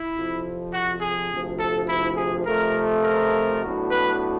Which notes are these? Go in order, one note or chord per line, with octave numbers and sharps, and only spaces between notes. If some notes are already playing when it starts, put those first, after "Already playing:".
Already playing: E4
F2 C3 F3
F#4
G#4
D2 C3 F3
A4
E4
G#4
F2 C3 F3 A3 A#4
A#4
A2 F#3 B3 D4 F#4
B4